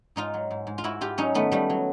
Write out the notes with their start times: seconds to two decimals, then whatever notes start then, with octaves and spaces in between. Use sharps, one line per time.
0.16 G#2 D#4 F4
0.34 F#3
0.51 G#2
0.67 G#2
0.78 F4
0.84 G#2 E4 F#4
1.01 G#2 F4 G4
1.18 F#3 C#4 D#4
1.34 D#3 A3 B3
1.51 D#3 G3 A3
1.70 F#3